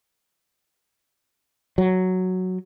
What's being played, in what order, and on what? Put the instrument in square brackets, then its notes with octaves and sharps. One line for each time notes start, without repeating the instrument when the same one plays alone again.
[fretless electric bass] F#3